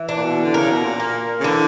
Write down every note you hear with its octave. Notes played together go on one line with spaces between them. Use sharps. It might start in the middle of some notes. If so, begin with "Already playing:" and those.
Already playing: E3
D4
A#2
B2
D3
C#3 A#4
B2
A#2
A#3
C#3
D3 E3